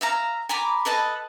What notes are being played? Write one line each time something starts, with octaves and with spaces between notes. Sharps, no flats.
E5 F5 A#5
G#5 A#5 B5 D6
A4 B4 D#5 A5